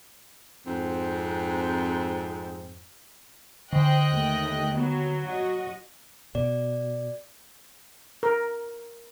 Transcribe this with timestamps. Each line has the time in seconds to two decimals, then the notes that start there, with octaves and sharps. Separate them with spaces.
0.65 F2 G#2 C4
3.73 D3 C5 D#5 G5 F#6
4.11 D#2 A3
4.75 F#3 B3
5.25 F#4 D#5
6.35 B2 D5
8.23 A#4